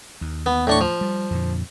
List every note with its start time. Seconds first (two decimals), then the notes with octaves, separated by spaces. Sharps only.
0.21 D#2
0.46 B3
0.67 A2 D4 C#6
0.81 F3
1.01 G3
1.31 F2 A#2 D3